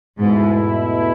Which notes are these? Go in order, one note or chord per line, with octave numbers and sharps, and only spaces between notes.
E2 G#2 B2 A3 E4